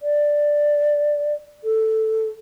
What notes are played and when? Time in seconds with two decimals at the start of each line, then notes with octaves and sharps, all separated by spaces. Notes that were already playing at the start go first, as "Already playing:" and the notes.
0.01 D5
1.64 A4